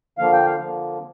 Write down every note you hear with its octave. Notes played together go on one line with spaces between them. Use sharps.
D3 F3 A#3 F5
G5
F5
D3 F3 A#3